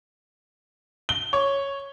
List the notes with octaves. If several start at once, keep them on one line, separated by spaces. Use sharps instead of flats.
G7
C#5